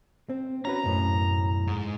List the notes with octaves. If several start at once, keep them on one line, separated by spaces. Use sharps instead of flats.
C4
C#4 F#4 B4 A#5
B1 F#2 A2
G#2